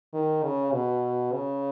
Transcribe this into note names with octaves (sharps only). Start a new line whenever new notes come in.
D#3
C#3
B2
C#3